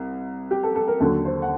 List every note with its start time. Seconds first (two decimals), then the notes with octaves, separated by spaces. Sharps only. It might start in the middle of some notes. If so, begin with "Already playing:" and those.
Already playing: C2 C3
0.51 G4
0.63 A4
0.75 A4
0.88 A#4
1.00 D#2 D3 F#3 A4
1.25 C5
1.42 F#5